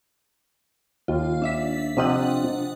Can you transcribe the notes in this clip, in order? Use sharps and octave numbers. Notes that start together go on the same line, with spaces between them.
D#2 F4
D4 E5 B6
C3 F3 C4 D4 D#5 F#5